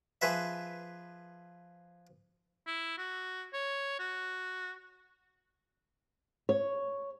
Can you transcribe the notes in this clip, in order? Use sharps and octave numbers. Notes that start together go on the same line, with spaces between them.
F3 G#4 B4 E5
E4
F#4
C#5
F#4
C#5